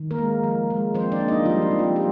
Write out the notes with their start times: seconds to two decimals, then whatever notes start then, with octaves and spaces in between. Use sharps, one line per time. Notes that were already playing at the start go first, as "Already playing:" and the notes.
Already playing: D#3
0.11 A#3 A#4
0.19 G#3
0.44 F3
0.70 G#3
0.95 F3 C4 C5
1.12 D4 D5
1.21 A#3
1.28 D#4 D#5
1.45 F3 G3 F4
1.62 D#4
1.71 C4
1.79 F3 F4
1.96 F3 G3 G4